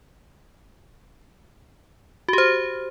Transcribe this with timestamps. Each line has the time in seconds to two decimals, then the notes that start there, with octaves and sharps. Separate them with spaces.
2.29 F#4
2.33 G4
2.38 C5